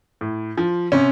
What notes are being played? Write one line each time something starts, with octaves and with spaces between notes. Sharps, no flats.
A2
F3
C3 C#4